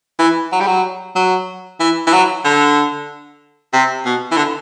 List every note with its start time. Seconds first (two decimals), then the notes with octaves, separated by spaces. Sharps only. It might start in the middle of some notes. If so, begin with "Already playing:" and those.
0.19 E3
0.52 F#3
0.60 G3
0.67 F#3
1.16 F#3
1.80 E3
2.07 E3
2.13 F#3
2.45 D3
3.74 C3
4.05 B2
4.32 E3
4.37 D3